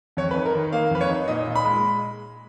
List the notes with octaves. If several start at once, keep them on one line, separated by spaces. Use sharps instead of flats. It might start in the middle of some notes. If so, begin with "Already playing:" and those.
F2 C#5
B4
D#4
A#4
D#3
A#3 F5
F2 B4
C#5
D#4
A#2 D#5
A#2
B5
G#3